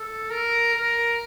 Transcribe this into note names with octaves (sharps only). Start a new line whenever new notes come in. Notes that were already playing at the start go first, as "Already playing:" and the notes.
Already playing: A4
A#4
A#4